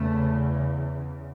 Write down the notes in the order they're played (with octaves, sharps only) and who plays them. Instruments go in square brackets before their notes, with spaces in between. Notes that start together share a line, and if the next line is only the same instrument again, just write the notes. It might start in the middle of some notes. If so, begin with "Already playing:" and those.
Already playing: [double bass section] E2 C#3 A3